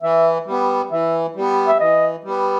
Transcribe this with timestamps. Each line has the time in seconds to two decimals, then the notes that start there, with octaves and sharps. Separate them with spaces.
0.02 E3 E5
0.46 G3 B3
0.91 E3 E5
1.36 G3 B3
1.68 E5
1.80 E3 D#5
2.24 G3 B3